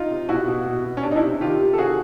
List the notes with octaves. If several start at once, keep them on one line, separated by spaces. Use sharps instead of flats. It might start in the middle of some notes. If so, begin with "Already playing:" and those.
Already playing: D#4 F4
C3
B2 E4 F#4
B2
B2
B2
C#4
C3 D4
D#4
D4 E4
C3
D#3 F4 G4
C3
A4
C3 F#4 G#4